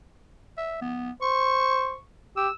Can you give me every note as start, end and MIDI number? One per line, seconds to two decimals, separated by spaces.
0.58 0.76 76
0.82 1.11 59
1.22 1.93 72
1.22 2.01 85
2.37 2.48 67
2.37 2.53 88